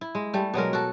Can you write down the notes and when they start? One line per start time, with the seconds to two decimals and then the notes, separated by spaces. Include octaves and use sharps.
0.01 E4
0.15 G#3
0.34 G3 A3
0.54 B2 F#3 G#3 A#4
0.73 F#4 A4